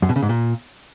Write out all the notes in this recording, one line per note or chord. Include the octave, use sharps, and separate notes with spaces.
F#2
B2
C#3
G#2
A#2